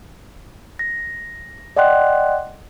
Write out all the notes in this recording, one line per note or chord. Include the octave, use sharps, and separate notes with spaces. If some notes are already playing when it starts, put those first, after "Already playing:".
A#6
D5 D#5 F#5 G5 C6 F#6